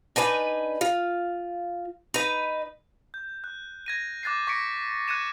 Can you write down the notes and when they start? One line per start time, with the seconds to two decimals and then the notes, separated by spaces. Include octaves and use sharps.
0.16 D4 D#4 B4 G#5
0.81 F4
2.14 D#4 B4
3.14 G6
3.44 F#6
3.86 G#6 A#6 D#7
4.23 D6 F#6 A6 A#6 C7
4.47 C#6 A#6 B6 C#7 D7
5.08 F#6 G#6 A6 C#7 D#7 E7